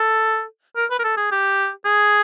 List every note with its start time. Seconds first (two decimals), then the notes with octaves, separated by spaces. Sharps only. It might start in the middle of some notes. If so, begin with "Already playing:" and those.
Already playing: A4
0.76 A#4
0.90 B4
0.99 A#4
1.04 A4
1.17 G#4
1.31 G4
1.85 G#4